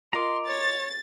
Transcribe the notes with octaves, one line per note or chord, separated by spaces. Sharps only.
F4 A#4 D#5 A#5 C6 D6
C#5 A6